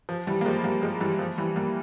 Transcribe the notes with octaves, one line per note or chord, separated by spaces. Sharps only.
F3
E3 G3
A#3
F3 G#3
G3 A#3
F3 G#3
E3 G3
F3
E3 G3
G3 A#3